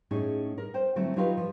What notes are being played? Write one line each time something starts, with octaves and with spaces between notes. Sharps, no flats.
A2 C#4 D#4 G#4
A#4
C5 G5
D3 F#3 A3 C4 E4
F#3 D#4 F4 G4 G#4 B4
F3